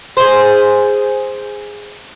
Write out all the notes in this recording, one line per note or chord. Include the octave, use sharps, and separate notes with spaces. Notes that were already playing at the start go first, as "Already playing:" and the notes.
G#4 C5